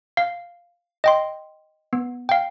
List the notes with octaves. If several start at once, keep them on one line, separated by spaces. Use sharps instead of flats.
F5
D#5 G5 C6
B3
F5 G5